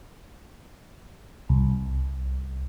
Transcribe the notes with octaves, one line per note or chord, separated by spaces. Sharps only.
C2